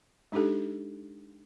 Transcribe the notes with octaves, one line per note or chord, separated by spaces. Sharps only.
G#3 D4 D#4 G4 A4